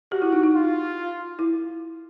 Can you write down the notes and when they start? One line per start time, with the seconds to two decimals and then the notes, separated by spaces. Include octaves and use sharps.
0.12 F#4 G4
0.22 E4
0.33 D#4
0.44 D#4
0.54 F4
1.39 E4